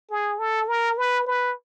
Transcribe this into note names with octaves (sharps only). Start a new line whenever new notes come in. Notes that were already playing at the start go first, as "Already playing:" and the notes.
G#4
A4
A#4
B4
B4